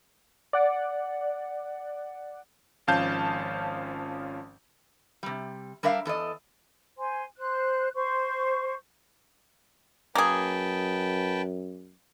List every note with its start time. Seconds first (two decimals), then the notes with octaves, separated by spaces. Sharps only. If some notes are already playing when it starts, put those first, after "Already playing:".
0.53 D5 F#5
2.87 G#1 F3 C#4 F5 A5 G6
5.23 C3 G3
5.83 G3 D4 A#4 E5 F5
6.05 E2 A4 D5 D#5
6.99 C5 G#5 C6
7.37 C5 F#6
7.94 C5 C#6
10.15 F#2 A#3 G#4 B4 G5 A5